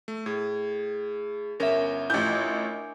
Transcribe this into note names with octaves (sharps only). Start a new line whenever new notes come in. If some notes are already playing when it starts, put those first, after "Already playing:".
A3
A2 G#4
G1 C#4 A#4 E5
A1 D4 E4 F4 G#5 G6